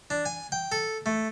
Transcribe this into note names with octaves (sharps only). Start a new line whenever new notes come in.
D4
G#5
G5
A4
A3